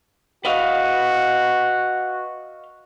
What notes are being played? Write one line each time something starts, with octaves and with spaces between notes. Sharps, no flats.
F#4 B4 D#5 F5